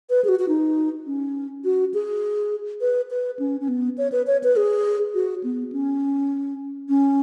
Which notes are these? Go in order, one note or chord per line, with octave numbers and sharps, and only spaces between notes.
B4
G#4
F#4
F#4
D#4
C#4
F#4
G#4
B4
B4
C#4
C#4
B3
C#5
B4
C#5
B4
G#4
F#4
B3
C#4
C#4